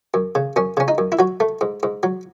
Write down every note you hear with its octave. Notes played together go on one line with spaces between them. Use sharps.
F#2
C#3
F#2 C#4
C#3 C#4
D#4
F#2
E4
F#3 F#4
A3
G#2
G#2
F#3